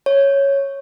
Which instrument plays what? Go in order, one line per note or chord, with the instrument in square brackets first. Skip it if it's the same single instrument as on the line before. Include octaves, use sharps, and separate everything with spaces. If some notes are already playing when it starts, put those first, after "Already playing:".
[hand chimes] C#5